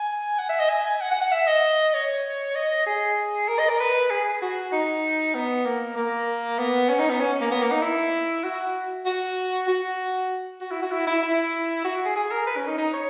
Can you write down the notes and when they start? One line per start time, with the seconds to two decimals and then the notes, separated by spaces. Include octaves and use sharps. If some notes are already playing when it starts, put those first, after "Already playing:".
Already playing: G#5
0.39 F#5
0.49 E5
0.60 D#5
0.70 G#5
0.85 G#5
1.01 F#5
1.11 F#5
1.21 F#5
1.32 E5
1.47 D#5
1.94 C#5
2.55 D#5
2.86 G#4
3.48 A#4
3.59 D#5
3.69 A#4
3.80 B4
4.10 G#4
4.42 F#4
4.72 D#4
5.34 B3
5.65 A#3
5.96 A#3
6.59 B3
6.89 C#4
7.00 D#4
7.10 B3
7.20 C#4
7.41 A#3
7.51 B3
7.62 A#3
7.72 D#4
7.82 E4
8.44 F#4
9.06 F#4
9.68 F#4
10.61 F#4
10.71 E4
10.82 F#4
10.92 E4
11.07 E4
11.23 E4
11.85 F#4
12.05 G#4
12.16 G#4
12.31 A#4
12.47 B4
12.57 C#4
12.67 D#4
12.78 D#4
12.93 C#5